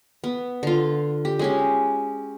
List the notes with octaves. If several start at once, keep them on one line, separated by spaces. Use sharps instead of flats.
B3
D3 F4
G4
G#3 C#4 G4